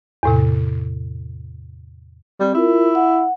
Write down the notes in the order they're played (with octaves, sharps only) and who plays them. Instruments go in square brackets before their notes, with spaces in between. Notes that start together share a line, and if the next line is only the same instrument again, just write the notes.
[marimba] E2 A2 C3
[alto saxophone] G3 [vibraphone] C4
[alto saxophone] E4 [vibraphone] F4 A#4
[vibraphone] F#5